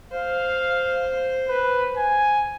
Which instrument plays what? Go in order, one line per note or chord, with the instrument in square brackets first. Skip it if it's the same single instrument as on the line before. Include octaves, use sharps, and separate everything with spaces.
[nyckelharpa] C5 [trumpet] F5
[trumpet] B4
G#5